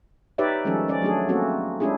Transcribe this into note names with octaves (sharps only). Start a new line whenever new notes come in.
D#4 G4 B4 C#5 D5 E5
D#3 F3 G3 G#3 C#4 A4
C#4 D5
F#3 A3 D4 G#4
A3 A#3 C4 C#4 F#4 A4
G#3 C#4 D4 E4 G4 G#4